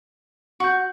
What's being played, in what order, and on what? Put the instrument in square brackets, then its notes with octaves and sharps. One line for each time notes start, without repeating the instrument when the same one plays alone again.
[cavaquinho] F#4 [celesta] C#6 G6